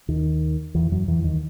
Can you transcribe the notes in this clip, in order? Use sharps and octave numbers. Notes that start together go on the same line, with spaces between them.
D#2 D#3
E2 E3
F#2 F#3
E2 E3
D#2 D#3